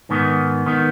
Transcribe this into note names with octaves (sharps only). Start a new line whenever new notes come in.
G#2 D#3 B3
D#3 B3